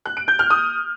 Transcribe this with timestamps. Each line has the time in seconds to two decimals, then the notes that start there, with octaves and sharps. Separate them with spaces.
0.06 F#6
0.17 D7
0.28 G6
0.39 F6
0.50 D#6